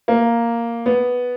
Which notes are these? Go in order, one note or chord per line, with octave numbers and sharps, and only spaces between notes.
A#3
B3